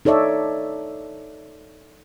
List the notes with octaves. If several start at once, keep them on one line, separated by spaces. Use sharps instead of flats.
D#4 A4 C#5 D5 E5